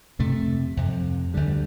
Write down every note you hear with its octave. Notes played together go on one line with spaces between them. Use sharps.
F2 C3 A3
F2 C3
D2 D3 G3